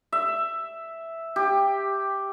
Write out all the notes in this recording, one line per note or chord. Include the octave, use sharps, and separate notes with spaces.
E5
G4